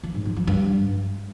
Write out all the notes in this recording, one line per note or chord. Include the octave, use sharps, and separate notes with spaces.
F3
G#2
F3
F3
G2